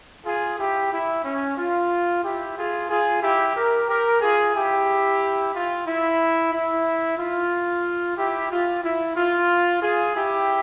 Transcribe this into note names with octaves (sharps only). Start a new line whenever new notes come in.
F4 G#4
E4 G4
E4
C#4
F4
E4 G4
F4 G#4
F4 G#4
E4 G4
G4 A#4
G4 A#4
F4 G#4
E4 G4
F4
E4
E4
F4
E4 G4
F4
E4
F4
F4 G#4
E4 G4